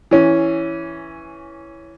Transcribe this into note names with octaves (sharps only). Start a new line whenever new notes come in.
E3 C#4